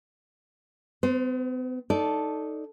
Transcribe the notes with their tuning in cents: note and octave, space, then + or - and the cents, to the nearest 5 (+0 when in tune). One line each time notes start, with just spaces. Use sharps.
B3 +45 C5 +0
D#4 +0 A4 +0 D5 -20